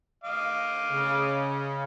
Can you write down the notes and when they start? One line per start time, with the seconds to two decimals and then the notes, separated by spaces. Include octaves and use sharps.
0.24 D#5 F5 D6
0.90 C#3